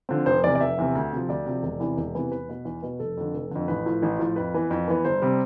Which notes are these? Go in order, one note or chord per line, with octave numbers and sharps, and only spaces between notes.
D3 F3 C4
F1 C5
E2 C3 D5
D5
F1 E5
E2 C3
D2
C3 F3
D2 D5
C3 F3
E1
E2 C3 E3 B3
E1
E2 C3 E3 B3
E2 B4
B2 B3
E2
B2 B3
F1 A4
F2 D3
F1
F2 D3
A1 B4
A2 F3
A1
A2 F3
F2 B4
E3 B3
F2
E3 B3
G1 C5
C3 G3